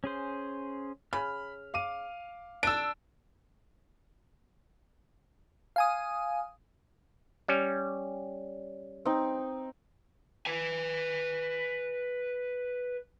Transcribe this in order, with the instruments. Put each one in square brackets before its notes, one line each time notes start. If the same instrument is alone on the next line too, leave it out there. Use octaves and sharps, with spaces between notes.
[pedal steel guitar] C#4 G#4 C5
[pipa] C#3 [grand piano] B5 [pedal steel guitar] F6
[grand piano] F5 D6 D#7
[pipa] D4 [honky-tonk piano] E6 D7
[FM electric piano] F5 G#5 D#6
[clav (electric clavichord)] G3 C#4
[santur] C4 D#4
[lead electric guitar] B4 G#5